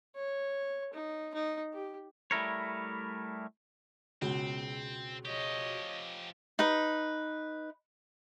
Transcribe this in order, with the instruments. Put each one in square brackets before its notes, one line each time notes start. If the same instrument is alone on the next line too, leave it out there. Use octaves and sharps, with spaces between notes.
[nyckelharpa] C#5
D#4
D#4
G4
[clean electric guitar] G3 A3 E4 A#4 C#5
[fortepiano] C#2 [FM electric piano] B2 F#4 G#4 [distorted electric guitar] C4
[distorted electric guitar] F3 G4 [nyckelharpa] C#5 D#5
[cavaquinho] D#4 B4